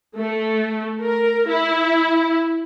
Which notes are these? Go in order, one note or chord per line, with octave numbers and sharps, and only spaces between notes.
A3
A#4
E4